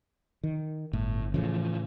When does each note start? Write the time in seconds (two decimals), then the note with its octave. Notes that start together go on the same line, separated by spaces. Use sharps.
0.44 D#3
0.93 G1 A2
1.34 A2 C#3 E3 F3